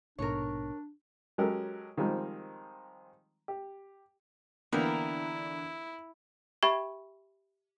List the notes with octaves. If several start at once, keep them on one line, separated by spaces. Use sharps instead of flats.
A#1 G#2 B2 D4 A#4 C#5
F#3 G#3 C#4 G4 A4 A#4
D#3 F3 G3 G#3 C4
G4
D3 E3 A#3 B3 D4 E4 A#4 G5
G4 E5 G5 B5 C#6 G#6